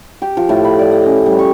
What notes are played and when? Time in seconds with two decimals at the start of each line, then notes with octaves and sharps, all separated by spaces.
0.22 G4
0.37 F3
0.49 A2
0.64 B5
0.79 D5
0.91 D#5
1.06 C#4
1.26 G3
1.39 C#6